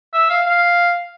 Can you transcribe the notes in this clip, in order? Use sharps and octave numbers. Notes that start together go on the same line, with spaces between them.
E5
F5
F5